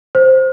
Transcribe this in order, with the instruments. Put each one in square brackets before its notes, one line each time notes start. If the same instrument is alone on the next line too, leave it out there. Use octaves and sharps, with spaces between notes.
[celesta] C5